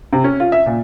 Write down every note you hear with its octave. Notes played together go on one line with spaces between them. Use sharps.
C3
C#4
F4
E5
A#2